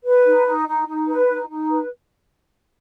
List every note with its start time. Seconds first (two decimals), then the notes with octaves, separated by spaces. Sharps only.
0.04 B4
0.24 D#4
0.45 D#4
0.66 D#4
0.87 D#4
1.07 B4
1.28 D#4
1.48 D#4
1.69 B4